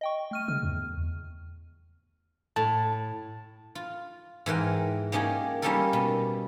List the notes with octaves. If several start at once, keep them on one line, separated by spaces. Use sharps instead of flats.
D#5 G5 C#6
A3 F6 D#7
C#3 F6
E2
A2 A5
F4
G#2 E3 A#4 G5
A#3 C#4 D#4 G4 G#4
G3 A#3 C#4 D#4 A4 A#4
B2